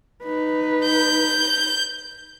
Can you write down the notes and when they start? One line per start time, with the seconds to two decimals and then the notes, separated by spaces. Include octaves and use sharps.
0.23 D#4 B4
0.85 G6